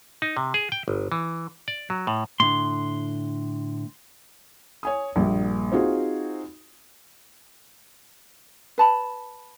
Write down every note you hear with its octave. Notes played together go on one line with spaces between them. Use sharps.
D#4
C3
G#4
G5
G1
E3
D5
F#3
A2
A2 D3 C6
C#5 G#5 D#6
A#1 G2 A#3
C4 D#4 F4 F#4 G#4
B4 A5 B5